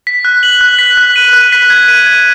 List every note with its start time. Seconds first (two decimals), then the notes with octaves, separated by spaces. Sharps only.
0.07 B6
0.25 F#6
0.43 F#7
0.61 F#6
0.79 B6
0.97 F#6
1.16 D#7
1.33 F#6
1.52 B6
1.70 G#6
1.88 D#7
2.06 G#6